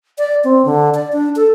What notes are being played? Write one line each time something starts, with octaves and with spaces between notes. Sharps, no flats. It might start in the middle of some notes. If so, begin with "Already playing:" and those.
D5
C4
D3
D5
D4
A4